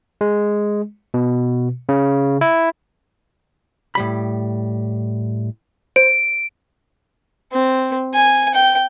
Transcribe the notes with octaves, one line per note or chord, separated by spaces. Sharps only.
G#3
B2
C#3
E4
A2 G3 B5
C5 D7
C4
G#5
G5